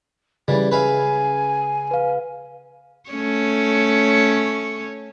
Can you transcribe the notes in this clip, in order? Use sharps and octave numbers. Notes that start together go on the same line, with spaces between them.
C#3 E3 G3 D5
B4 E5 F5 G#5
B4 F5
A3 C#4 C#5